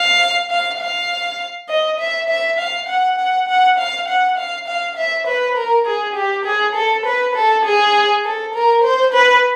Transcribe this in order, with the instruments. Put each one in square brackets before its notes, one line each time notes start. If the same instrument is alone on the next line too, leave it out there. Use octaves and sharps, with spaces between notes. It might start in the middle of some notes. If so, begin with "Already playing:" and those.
Already playing: [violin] F5
F5
F5
D#5
E5
E5
F5
F#5
F#5
F#5
F5
F#5
F5
F5
E5
B4
A#4
G#4
G4
G#4
A4
B4
A4
G#4
A4
A#4
C5
B4